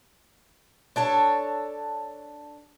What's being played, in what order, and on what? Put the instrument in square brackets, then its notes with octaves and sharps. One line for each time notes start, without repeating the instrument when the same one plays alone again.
[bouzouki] D4 A4 C#5